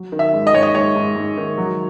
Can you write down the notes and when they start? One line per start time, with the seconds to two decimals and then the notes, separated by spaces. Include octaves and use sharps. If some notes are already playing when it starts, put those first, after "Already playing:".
Already playing: F#3
0.12 D#3
0.19 E5
0.33 G#2
0.47 D#5
0.54 G#2 C#5
0.63 D#5
0.75 G#2 C#5
0.95 G#2
1.16 G#2
1.37 D#3
1.58 F#3